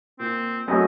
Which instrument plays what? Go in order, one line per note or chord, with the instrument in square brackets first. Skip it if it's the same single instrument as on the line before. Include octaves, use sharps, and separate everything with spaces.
[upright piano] A#2 [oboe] C4
[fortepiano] F#2 A3 [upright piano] F#4 A4 C#5 [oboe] D#5